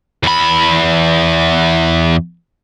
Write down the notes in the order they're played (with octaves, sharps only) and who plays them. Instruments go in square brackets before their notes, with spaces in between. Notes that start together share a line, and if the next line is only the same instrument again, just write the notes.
[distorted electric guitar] E2 B5